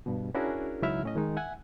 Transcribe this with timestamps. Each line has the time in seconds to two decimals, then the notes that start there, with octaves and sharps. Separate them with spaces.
0.06 G2 B2
0.35 C#4 D4 E4 F#4 G#4 A#4
0.82 C#2 F#3 D#4 E4 E5 F6
1.03 A2 C#4 D#5
1.16 D#3 G#3 D#4
1.36 E5 F#5 G#5